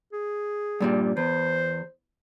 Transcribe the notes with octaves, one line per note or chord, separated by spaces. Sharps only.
G#4
G2 A#2 G3
E2 C5